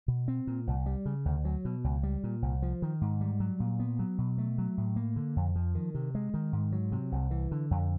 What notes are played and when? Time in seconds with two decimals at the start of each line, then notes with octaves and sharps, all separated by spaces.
0.08 B2
0.28 C4
0.47 A#2
0.67 C2
0.86 G3
1.06 C#3
1.25 D2
1.45 F#3
1.65 B2
1.84 C#2
2.03 G3
2.24 A#2
2.42 C2
2.62 F3
2.82 D#3
3.01 G#2
3.21 G3
3.40 F#3
3.60 A#2
3.79 B3
3.99 F#3
4.18 B2
4.38 A3
4.58 F#3
4.78 A2
4.96 A#3
5.16 D3
5.36 F2
5.56 F3
5.75 D#3
5.95 C3
6.15 G#3
6.34 D#3
6.53 G#2
6.72 F#3
6.92 C3
7.12 C2
7.31 E3
7.52 D3
7.71 F2